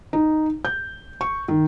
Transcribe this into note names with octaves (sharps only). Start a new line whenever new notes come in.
D#4
G6
C#6
D#3